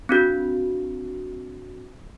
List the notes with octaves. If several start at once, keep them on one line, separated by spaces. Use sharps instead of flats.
C4 D4 F#4